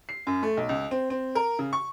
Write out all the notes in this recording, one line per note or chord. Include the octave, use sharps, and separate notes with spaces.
C7
F#2
A3
B1
C#2
C4
C4
A#4
C#3
C#6